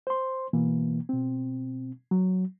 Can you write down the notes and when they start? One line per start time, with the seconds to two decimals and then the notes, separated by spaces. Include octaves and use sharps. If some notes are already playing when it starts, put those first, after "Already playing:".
0.07 C5 C6
0.53 B2 E3 A#3
1.09 B2 C4
2.11 F#3